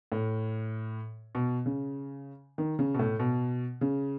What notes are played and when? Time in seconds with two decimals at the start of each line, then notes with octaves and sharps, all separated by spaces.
0.12 A2
1.35 B2
1.66 C#3
2.58 D#3
2.79 C#3
2.94 B2
2.99 A2
3.20 B2
3.81 C#3